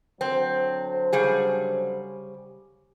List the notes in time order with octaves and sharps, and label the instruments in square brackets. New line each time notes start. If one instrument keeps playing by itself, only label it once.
[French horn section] D3 F#3 C5 [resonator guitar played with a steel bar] C4
[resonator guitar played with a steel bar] C#3 G3 G#4